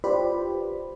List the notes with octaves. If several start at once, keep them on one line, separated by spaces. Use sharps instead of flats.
F4 G4 B4 C5 D5 B5